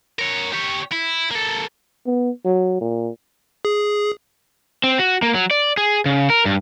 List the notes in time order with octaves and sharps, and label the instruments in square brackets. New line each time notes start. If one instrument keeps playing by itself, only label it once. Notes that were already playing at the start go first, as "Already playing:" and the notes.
[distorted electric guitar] A#4 C#5
G4 C#5
E4
A#3 A4
[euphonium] B3
F#3
A#2
[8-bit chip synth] G#4
[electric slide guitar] C4
F#4
A#3
F#3
D5
G#4
C#3
A#4
G2